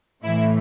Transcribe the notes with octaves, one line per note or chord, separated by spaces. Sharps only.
A2 E3 A3 E4